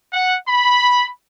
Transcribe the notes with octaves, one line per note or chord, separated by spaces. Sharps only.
F#5
B5